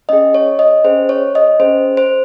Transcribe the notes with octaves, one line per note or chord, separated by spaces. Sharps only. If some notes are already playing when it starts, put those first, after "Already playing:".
C#4 G#4 D#5
C#5
D#5
C#4 G#4 C5
C#5
D#5
C#4 G#4 C5
C5